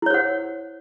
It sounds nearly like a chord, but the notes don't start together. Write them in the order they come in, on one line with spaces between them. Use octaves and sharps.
E4 C#5 C5 F#5